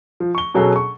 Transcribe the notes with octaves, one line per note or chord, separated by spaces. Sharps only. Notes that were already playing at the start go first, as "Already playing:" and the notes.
F3
C#6 G7
B2 F#3 C#4 G#4 A4
C#6